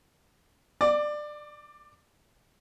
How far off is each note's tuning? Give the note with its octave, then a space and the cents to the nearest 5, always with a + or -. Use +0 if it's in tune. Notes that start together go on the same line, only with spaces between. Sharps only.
D5 +20 D6 -5